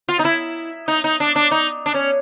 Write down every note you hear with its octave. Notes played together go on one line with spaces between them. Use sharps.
F4
D#4
E4
D#4
D#4
D4
D4
D#4
D4
C#4